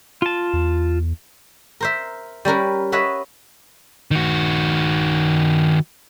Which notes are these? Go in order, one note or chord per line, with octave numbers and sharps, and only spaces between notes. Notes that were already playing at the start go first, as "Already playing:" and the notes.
F4 A5
E2
A#4 C5 E5
G3 C#4 A#4 B4
B4 C#5 D#5 E5 F#5
D#3 F#4